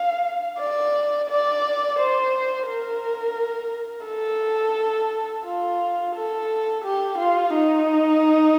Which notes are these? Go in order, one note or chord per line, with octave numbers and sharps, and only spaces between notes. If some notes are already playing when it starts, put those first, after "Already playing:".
Already playing: F5
D5
D5
C5
A#4
A4
F4
A4
G4
F4
D#4